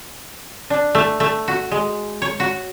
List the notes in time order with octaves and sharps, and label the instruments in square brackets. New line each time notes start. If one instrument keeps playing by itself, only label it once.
[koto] D4
A3
A3
F#4
G#3
C#5
F#4